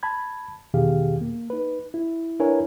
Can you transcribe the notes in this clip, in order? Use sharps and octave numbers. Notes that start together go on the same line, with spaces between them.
A5 B5 G#6
E2 B2 D#3 G4 G#4 F5
A#3
D#4 B4
E4
D4 E4 A#4 B4 C#5 G#5